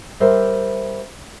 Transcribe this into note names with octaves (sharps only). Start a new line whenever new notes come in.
G3 A#4 C5 E5